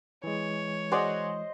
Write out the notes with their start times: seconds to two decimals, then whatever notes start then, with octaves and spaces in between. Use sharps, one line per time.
0.24 E3 G#3 C#5
0.92 F#4 G#4 C5 D5 D#5